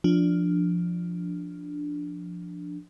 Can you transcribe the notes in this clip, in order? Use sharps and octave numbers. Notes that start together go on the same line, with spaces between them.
F3 D4